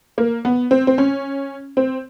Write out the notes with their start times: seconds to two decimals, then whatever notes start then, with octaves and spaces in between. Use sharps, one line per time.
0.18 A#3
0.45 B3
0.71 C4
0.87 C4
0.98 C#4
1.77 C4